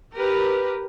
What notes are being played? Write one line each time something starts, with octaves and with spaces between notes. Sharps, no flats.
G4 A#4 B4